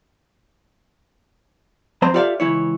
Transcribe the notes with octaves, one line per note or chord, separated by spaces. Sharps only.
F2 C4 C5 A#5 C6
F4 G4 A4 D5 E5 F5
C#2 E3 E4 C#5